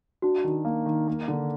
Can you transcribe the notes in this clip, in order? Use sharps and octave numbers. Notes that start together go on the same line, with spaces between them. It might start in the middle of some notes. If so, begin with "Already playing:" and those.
D4 F#4
D#3
A#3
D#3
A#3
D3